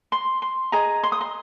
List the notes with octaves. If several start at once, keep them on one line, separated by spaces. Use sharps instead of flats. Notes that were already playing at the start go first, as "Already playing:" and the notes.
C6
C6
G#4 D#5 A#5
C6
D#6
C6